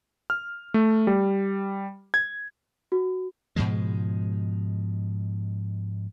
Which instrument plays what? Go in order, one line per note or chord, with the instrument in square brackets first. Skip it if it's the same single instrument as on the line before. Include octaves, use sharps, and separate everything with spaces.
[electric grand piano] F6
A3
G3
G#6
[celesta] F#4
[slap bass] G#2 B2 F3 G#3